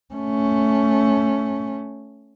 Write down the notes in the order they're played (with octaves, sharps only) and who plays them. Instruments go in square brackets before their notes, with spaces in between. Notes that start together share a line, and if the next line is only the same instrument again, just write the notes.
[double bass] A3 C#4